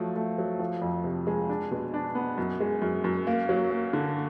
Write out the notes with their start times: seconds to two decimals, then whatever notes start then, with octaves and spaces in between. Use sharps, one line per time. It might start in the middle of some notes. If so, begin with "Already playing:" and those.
Already playing: F3 F#3 A3
0.16 A3
0.38 F#3
0.59 F3
0.82 F2
1.04 C3
1.27 G#3
1.49 D4
1.71 B2
1.94 D4
2.15 B3
2.38 F#2
2.60 G#3
2.82 F#2
3.04 F#2
3.27 A#3
3.49 F#3
3.71 A#3
3.93 D3